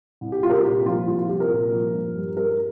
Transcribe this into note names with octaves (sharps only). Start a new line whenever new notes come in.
C2
G4
C2 F4
A#4
G4
A#2 G4
F3 F4
C2 F4
F4
C2 G4
A#4
A#2
F3
G2
G3
G3 A#4